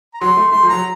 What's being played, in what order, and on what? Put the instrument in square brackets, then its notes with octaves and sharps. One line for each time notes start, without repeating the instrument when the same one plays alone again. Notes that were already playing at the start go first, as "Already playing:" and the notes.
[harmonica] A#5
[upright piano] F#3 [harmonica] C6
[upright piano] A3
[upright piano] A3 [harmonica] C6
[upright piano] F3
[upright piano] F#3 [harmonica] A#5